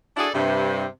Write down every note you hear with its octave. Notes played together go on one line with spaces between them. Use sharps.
D4 E4 F#4 G#4 A4 D5
G2 C3